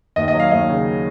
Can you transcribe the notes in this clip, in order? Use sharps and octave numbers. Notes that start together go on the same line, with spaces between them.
D#2 D#5
D#5
F#3
F5
D#2 D#5
C#3